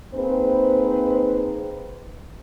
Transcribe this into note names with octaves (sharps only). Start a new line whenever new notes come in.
A#3 C4 D#4 G#4 B4 C5